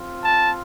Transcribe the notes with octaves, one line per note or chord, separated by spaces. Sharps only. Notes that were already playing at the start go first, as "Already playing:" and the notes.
Already playing: C4 F4
A5